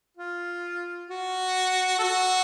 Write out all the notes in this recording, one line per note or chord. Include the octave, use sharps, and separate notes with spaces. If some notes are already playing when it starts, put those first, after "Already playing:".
F4
F#4
A4
F#4